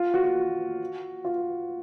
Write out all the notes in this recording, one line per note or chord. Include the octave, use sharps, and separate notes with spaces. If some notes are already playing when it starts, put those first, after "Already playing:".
Already playing: F4
F#4
F#4
F4